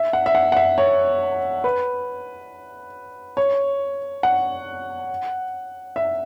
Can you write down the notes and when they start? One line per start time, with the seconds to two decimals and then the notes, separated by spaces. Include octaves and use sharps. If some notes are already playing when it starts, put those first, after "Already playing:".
Already playing: E5
0.13 F#5
0.26 E5
0.35 F#5
0.52 F#5
0.57 E5
0.78 C#5
1.64 B4
3.37 C#5
4.23 F#5
5.96 E5